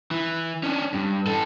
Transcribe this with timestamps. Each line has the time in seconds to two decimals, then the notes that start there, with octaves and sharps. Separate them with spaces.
0.11 E3
0.63 C#4 D4
0.94 G2
1.27 E3 A4